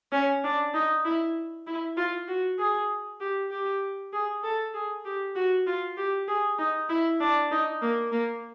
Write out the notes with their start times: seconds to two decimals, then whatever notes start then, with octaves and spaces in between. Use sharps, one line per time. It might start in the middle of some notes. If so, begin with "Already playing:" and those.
0.12 C#4
0.43 D4
0.74 D#4
1.04 E4
1.67 E4
1.97 F4
2.28 F#4
2.59 G#4
3.20 G4
3.51 G4
4.13 G#4
4.43 A4
4.74 G#4
5.05 G4
5.35 F#4
5.66 F4
5.97 G4
6.27 G#4
6.58 D#4
6.89 E4
7.20 D4
7.51 D#4
7.82 A#3
8.12 A#3